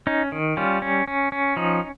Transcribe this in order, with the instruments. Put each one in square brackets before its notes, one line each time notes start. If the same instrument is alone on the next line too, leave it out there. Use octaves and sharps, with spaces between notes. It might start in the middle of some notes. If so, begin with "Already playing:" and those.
[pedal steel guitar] C#4 D#4
D#3
G3 C#4 F4
C#4
C#4
C#4
F3 D#4